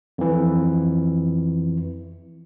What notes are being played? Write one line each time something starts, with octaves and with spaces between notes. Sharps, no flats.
F2 E3